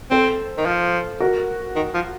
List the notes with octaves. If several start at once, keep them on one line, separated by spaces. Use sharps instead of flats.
C4 A4 C5
D#3
F3
F#4 A#4
D#3
F3